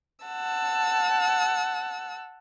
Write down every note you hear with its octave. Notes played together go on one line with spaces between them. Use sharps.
F#5 A5 E6